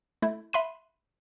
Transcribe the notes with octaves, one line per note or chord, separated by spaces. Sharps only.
A3 E4
E5 B5 C6 F#6 D#7